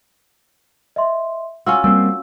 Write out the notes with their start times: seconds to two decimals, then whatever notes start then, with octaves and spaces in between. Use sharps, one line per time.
0.96 D#5 E5 C6
1.67 C#4 F4 F#4 E6
1.84 G3 A#3 C4 E6